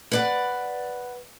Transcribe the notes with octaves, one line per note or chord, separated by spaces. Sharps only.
B4 D5 F#5